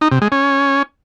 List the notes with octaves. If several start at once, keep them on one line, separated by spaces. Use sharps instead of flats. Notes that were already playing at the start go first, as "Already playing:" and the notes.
D#4
C3
G#3
C#4